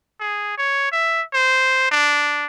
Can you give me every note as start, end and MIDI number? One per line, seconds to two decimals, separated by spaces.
0.20 0.53 68
0.58 0.87 73
0.92 1.23 76
1.33 1.86 72
1.91 2.47 62